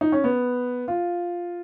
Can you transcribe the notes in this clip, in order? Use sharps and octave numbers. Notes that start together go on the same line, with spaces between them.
D#4
C#4
B3
F4